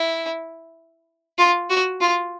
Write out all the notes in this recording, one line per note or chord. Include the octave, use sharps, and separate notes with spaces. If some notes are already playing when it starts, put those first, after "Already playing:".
Already playing: E4
F4
F#4
F4